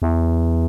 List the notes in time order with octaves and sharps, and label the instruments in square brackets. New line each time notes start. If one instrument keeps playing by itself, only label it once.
[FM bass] E2